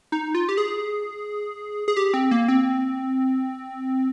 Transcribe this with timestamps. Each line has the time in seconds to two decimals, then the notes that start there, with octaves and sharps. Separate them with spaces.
0.12 D#4
0.35 F4
0.49 G4
0.58 G#4
1.88 G#4
1.97 G4
2.14 C4
2.31 A#3
2.48 C4